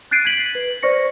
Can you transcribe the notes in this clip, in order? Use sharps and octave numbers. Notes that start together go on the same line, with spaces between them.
F#6 G6 A6 C7 D7 D#7
G#6 B6 F#7
B4
C5 D5 C#6 A#6 C#7